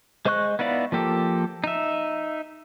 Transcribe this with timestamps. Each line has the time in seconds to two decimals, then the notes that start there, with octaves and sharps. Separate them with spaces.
0.25 G#3 C5 D#5 C#6 F#6
0.59 B3 D#4 E4 D5 F5
0.92 F3 A#3 G4 A4
1.64 D#4 E5